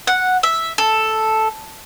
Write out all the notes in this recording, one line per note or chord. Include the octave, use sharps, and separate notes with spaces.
F#5
E5
A4